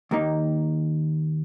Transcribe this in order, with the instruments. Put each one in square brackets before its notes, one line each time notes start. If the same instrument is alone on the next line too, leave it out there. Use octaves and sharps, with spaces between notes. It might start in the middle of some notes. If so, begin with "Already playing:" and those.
[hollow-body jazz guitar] D#2 D#3 A#3 D#4